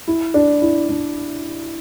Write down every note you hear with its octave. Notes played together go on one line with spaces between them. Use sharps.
E4
D4
E4
D4